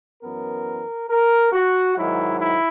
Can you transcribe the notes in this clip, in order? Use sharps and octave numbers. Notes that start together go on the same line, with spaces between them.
F#2 E3 B3 A#4
A#4
F#4
G#2 D#3 F#3 E4
E4